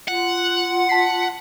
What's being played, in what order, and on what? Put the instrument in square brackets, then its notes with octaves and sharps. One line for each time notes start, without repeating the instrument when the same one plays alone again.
[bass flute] F4 [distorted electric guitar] F#5
[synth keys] A5 B6 C7